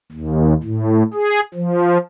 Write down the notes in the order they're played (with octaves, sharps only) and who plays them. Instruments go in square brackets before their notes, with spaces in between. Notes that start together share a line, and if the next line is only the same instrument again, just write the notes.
[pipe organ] D#2
A2
G#4
F3